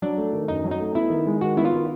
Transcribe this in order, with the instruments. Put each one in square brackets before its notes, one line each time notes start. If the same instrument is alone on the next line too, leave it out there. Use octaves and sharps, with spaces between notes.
[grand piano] F#3 [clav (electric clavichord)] D4
[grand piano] A3
D#3
[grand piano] F#2 [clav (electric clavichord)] D#4
[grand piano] F#3
[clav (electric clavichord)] D#4
[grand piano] A3
[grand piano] B3 [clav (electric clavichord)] E4
[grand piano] D#3
G#3
[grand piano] D#3 [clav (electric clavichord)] F#4
[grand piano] B3 [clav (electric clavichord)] E4
[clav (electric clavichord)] F4
[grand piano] D#3